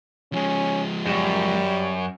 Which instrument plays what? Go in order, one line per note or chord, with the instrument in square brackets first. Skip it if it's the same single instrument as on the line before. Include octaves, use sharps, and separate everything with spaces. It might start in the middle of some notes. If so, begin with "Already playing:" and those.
[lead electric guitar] F3 G#3 [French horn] C#4
[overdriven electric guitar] F#2 [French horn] G3